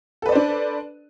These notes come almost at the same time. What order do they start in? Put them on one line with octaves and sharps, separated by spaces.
A4 B4 D5 C5 D4